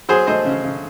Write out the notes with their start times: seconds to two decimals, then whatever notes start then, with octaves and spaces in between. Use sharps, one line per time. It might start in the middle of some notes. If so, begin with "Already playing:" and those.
0.09 F#3 G#4 C5
0.27 A3 C5 D#5
0.46 C#3
0.64 C#3